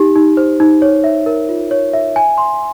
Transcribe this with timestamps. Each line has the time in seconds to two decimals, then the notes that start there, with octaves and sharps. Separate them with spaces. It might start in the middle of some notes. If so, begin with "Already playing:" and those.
Already playing: D#4 G4
0.16 D#4
0.37 C5
0.60 D#4
0.82 C#5
1.04 E5
1.26 A#4
1.49 F4
1.71 C#5
1.93 E5
2.16 G#5
2.38 C6